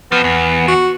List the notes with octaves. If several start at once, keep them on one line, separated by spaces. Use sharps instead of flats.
F2 F3 B3
E2
F#4